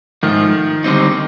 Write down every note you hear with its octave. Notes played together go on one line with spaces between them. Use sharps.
G#2 D#3 F3 A3
D3 G3 C4 D#4